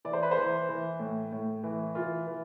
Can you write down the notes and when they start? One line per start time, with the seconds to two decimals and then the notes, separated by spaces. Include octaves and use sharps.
0.05 E3 D5
0.13 C5
0.23 B4
0.31 C5
0.37 E3
0.69 E3
1.00 A2
1.32 A2
1.63 E3
1.95 E3 F4
2.27 E3